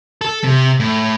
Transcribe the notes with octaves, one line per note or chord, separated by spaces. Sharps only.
A4
C3
A2